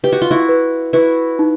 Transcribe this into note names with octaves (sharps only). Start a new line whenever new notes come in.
G4 B4
F#4
F4
E4 F#4
B4
E4 F#4 B4
D#4